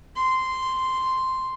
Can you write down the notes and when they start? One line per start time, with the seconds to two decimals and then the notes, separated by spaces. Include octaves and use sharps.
0.16 C6